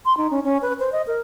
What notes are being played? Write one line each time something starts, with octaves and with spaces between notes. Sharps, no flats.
C6
D#4
C#4
C#4
B4
C5
D#5
A#4